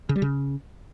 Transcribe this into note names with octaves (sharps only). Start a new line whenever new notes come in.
C#3
G3
C#3